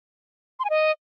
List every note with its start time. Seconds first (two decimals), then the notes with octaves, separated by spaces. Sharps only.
0.59 C6
0.65 G#5
0.70 D#5